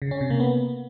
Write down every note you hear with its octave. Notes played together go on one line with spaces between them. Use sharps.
C#3
C#4
C3
A#3
B3